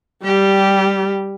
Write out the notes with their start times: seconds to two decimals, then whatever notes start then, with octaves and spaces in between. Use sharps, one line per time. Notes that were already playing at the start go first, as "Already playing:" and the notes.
0.25 G3 G4